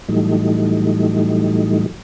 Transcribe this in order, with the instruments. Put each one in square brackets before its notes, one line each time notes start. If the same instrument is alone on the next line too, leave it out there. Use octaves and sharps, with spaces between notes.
[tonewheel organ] A2 E3 F#3 G3 A3 D#4